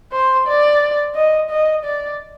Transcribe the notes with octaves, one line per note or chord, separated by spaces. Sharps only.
C5
D5
D#5
D#5
D5